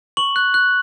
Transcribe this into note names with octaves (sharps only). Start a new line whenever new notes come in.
C#6 F#7
F#6
F#6